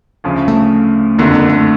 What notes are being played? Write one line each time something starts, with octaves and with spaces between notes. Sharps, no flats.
D2 C#3 F3
A3
F#1 F2 D3 A#3
A#3
A3